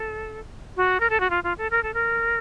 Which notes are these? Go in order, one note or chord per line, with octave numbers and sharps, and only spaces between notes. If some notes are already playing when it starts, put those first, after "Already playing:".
Already playing: A4
F#4
A#4
A4
F#4
F4
F4
A4
A#4
A4
A#4